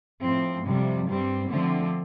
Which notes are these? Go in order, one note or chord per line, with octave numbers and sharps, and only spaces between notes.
A2 F3 C4
F2 C3 G3
G2 G3 C4
D3 F3 A3 C4